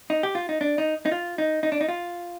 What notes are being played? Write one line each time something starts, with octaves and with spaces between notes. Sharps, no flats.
D#4
G4
F4
D#4
D4
D#4
D#4
F4
D#4
D#4
D4
D#4
F4